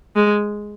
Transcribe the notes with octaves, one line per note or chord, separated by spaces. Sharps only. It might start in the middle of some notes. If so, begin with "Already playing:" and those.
G#3